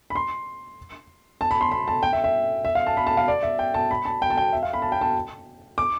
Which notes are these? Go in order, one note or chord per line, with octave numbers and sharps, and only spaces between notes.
B5
C6
A5
B5
C6
B5
A5
G5
E5
E5
E5
F5
A5
B5
A5
F5
D5
E5
G5
A5
B5
A5
G5
A5
G5
E5
F5
B5
A5
G5
A5
D6